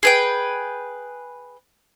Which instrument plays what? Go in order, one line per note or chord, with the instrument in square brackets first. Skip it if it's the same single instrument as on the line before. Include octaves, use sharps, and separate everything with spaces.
[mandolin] G#4 B4 G5